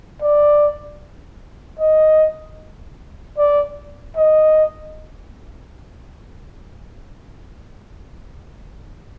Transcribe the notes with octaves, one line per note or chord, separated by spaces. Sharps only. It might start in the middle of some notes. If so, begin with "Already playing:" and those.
D5
D#5
D5
D#5